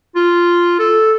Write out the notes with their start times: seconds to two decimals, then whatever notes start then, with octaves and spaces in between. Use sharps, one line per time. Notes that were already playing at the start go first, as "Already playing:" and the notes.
0.16 F4
0.79 A4